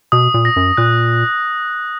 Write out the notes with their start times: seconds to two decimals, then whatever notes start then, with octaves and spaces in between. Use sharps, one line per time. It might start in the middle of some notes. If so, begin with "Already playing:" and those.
0.12 B2 D#6
0.34 A#2
0.45 A#6
0.56 F#2
0.77 A#2 F#6